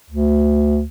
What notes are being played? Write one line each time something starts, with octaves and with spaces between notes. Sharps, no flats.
D2